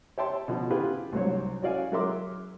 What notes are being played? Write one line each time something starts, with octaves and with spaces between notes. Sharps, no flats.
C#5 E5 G5 A5 C6
B2 D3 F3
E4 F4 G4 G#4 B4 F5
C2 G#2 F#3 C5 C#5
C#4 F#4 D5 F5 G#5
F#3 G#3 A#4 E5 C6 D6